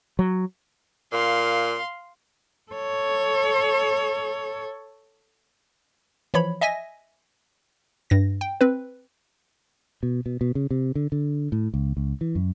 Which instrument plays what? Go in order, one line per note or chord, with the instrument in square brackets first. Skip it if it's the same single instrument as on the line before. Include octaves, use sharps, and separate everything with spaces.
[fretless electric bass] F#3
[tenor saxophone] A#2 [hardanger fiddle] F5 C6
[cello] A4 C#5
[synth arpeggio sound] E3 F3 C#5 B5
D#5 E5 G#5 A#6
G2 A#6
G5
C4 B4
[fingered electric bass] B2
B2
B2
C#3
C3
D3
D3
A2
C#2
C#2
E3
F#2